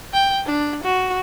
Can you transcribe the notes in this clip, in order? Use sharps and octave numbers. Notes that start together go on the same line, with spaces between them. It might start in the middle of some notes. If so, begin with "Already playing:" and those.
G5
D4
F#4